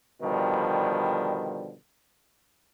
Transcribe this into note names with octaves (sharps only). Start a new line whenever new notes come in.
B2 D3 D#3 F3 G3